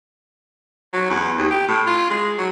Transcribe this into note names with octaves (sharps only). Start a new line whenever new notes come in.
F#3
E2
D#2
G4
A2
F4
G#3
F#3